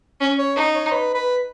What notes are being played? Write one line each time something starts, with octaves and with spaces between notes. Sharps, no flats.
C#4
C#5
D#4
C#5
B4
B4